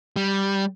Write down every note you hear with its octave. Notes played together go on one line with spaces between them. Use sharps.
G3